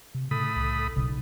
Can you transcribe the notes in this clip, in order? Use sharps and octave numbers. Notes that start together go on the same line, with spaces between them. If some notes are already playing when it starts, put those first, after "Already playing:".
C3
A2 C#3 B5 D#6
C2
B1 C#3